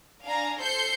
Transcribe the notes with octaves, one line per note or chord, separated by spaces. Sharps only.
D4 D5 F5 G#5 A#5
A4 C5 G6 C7 C#7